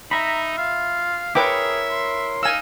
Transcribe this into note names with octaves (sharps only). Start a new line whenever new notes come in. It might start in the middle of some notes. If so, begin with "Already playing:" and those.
D#4 E5 A#5 B5
F4 F5
E4 G#4 A#4 B4 C#5 E5 G5 D6
C6
D#4 F5 G#5 E6